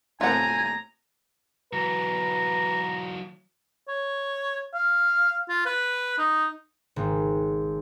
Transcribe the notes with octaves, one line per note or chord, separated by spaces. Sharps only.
A2 A3 C4 F4 F#5 G#5 A#5
E3 F#3 B4 A#5
C#5
F5
F4
B4
D#4
G#1